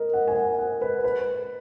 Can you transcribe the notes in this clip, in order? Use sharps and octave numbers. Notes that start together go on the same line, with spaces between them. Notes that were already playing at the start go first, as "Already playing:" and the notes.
Already playing: A#4 D#5
F#5
G#5
F#5
F#5
B4
B4